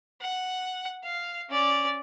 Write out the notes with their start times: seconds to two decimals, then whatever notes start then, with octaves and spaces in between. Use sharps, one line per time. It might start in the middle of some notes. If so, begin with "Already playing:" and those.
0.21 F#5
1.04 F5
1.50 C#4 D5